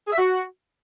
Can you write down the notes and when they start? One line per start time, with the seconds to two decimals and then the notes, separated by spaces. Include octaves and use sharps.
0.07 G#4
0.12 E5
0.17 F#4